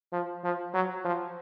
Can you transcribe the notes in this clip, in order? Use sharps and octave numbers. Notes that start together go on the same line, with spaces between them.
F3
F3
F#3
F3